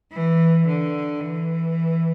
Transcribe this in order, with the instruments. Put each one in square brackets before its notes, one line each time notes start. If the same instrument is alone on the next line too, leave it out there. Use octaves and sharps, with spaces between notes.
[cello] E3
D3
E3